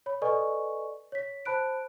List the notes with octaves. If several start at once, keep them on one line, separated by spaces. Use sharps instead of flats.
C#5 B5
A4 B4 D5 D#5 G#5 C#6
C#5 B6
C5 A5 B5 F#6 D7